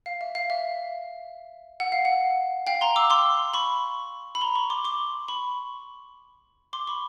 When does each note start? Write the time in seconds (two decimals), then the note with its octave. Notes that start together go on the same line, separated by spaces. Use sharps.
0.06 F5
0.21 E5
0.35 F5
0.50 E5
1.80 F#5
1.92 F5
2.05 F#5
2.67 F5 G5
2.81 A#5 C6
2.96 D6 E6
3.10 C6 D6
3.54 B5 C#6
4.35 B5
4.41 A#5 C6
4.55 B5 C#6
4.70 C6 D6
4.85 C6 D6
5.28 B5 C#6
6.73 C6 D6
6.87 B5 C#6